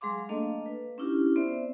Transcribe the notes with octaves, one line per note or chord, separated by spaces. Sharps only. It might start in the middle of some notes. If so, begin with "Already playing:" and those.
F#3 G#3 G#4 F5 C6 D6
A3 A#3 D4 A4 D#5 F5
B4
C#4 D4 E4 F4 G4
B3 C4 C5 D5 E5